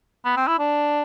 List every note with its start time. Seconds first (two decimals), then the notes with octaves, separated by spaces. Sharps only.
0.25 B3
0.37 C4
0.47 E4
0.59 D4